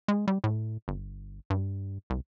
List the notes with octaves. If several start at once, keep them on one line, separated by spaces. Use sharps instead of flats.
G#3
G3
A2
G1
G2
C2